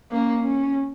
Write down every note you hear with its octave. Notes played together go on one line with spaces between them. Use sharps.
A#3 C#4
C#4